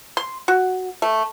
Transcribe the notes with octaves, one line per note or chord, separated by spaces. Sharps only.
C6
F#4
A3